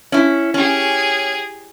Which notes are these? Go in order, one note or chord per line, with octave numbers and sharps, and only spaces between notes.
C#4 E4
C#4 G4 G#4